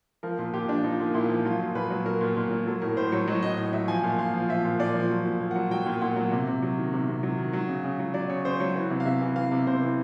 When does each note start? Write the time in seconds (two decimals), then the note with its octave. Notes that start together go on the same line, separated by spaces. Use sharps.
0.23 F3 A#4
0.38 A#2
0.54 A#2 G4
0.69 F3 D4
0.84 F3 D#4
1.00 A#2
1.14 A#2 E4
1.29 F3
1.45 F#3 F4
1.60 A#2
1.75 A#2 B4
1.90 F#3
2.06 F#3 A#4
2.21 A#2
2.37 A#2
2.51 F#3
2.67 F#3 A4
2.82 A2 A#4
2.97 A2 C5
3.12 F#3 C#5
3.27 F#3 D#5
3.43 A2 D#5
3.58 A2 D#5
3.73 F#3 E5
3.88 F3 G#5
4.03 A#2
4.19 A#2 F5
4.34 F3
4.49 F3 E5
4.65 A#2
4.79 A#2 D5
4.95 F3
5.10 F#3
5.25 A#2
5.41 A#2
5.51 F#5
5.56 F#3
5.71 F#3 G5
5.86 A#2
6.01 A#2 F#5
6.16 F#3
6.31 C3
6.47 C3
6.62 F#3
6.78 D#3
6.93 C3
7.08 C3
7.23 F#3
7.38 D#3
7.53 F#3
7.69 C#3
7.84 C#3
7.99 F#3
8.14 F#3 D5
8.30 C#3 C#5
8.45 C#3 C5
8.60 F#3 C#5
8.76 E3
8.90 C3
9.00 F5
9.05 C3 E5
9.21 E3
9.36 E3 F5
9.51 C3
9.67 C3 C5
9.82 E3